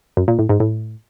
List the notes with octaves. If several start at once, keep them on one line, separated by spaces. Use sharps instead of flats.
F#2
A#2
A2
G#2
A2